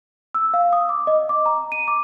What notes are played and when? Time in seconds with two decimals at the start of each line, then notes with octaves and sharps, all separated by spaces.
0.35 E6
0.54 F5
0.73 D#6
0.89 D6
1.07 D#5
1.29 D6
1.46 A#5
1.72 D#7
1.88 D6